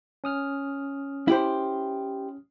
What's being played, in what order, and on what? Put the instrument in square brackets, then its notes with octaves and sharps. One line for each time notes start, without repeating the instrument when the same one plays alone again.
[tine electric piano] C#4 D#6 F6
[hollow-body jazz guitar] E4 G4 C5